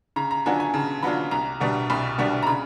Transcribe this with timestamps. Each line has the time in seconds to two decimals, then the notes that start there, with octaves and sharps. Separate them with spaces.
0.16 C#3 A#5
0.31 A#5
0.46 F#3 B3 D4 F4 G#5
0.60 G#5
0.74 C#3 A5
1.02 F#3 B3 D4 F4 B5
1.31 C2 A#5
1.60 B2 G3 B3 D4
1.90 C2 B5
2.18 B2 G3 B3 D4
2.43 A#5
2.47 C#3 B5